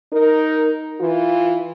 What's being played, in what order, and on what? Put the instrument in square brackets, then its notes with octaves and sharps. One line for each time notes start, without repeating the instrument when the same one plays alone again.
[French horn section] D#4 A#4
E3 F4